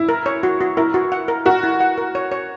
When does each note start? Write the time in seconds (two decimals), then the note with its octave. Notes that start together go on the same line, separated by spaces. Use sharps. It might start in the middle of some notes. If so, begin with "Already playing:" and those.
Already playing: E4
0.09 A#4
0.26 C#5
0.43 F#4
0.61 F#4
0.77 E4 A#4
0.94 F#4
1.12 F#5
1.28 A#4
1.46 F#4 A#4
1.63 E4
1.81 F#5
1.98 A#4
2.15 C#5
2.32 C#5